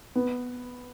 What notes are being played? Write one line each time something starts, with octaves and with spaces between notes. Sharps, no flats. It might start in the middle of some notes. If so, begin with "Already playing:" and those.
B3